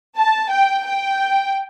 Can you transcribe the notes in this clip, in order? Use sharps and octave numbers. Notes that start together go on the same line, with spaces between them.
A5
G5
G5